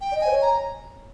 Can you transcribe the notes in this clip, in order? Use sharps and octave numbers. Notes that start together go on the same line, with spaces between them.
G5
D5
D#5
G#5
C5
C#5
A#5